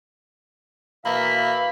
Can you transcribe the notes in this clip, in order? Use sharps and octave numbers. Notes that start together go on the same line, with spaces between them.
B2 E3 A#3 E5 F5 B5